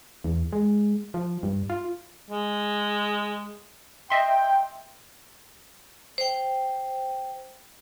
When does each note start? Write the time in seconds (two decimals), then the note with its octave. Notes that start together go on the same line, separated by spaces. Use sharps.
0.24 E2
0.52 G#3
1.14 F3
1.43 G2
1.70 F4
2.30 G#3
4.10 D#5 E5 G5 C6
6.18 C5 G5